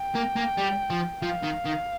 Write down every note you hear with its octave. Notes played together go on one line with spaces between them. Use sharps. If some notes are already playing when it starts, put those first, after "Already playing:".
Already playing: G5
A#3
A#3
G3
F3
F3 F5
D#3
D#3